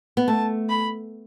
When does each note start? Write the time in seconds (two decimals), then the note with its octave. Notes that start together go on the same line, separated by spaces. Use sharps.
0.17 B3
0.28 A3 A5
0.69 B5